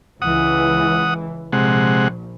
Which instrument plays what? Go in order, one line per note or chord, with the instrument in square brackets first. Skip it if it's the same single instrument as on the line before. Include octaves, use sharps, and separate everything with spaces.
[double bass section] C#2 E3 [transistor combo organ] F#5 D#6
[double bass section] A#1 [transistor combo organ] C3 G#3 F#5